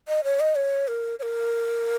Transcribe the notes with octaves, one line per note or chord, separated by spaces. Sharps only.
D#5
C#5
D#5
C#5
A#4
C#5
A#4